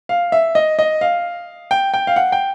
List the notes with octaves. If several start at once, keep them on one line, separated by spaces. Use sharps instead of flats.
F5
E5
D#5
D#5
F5
G5
G5
F5
F#5
G5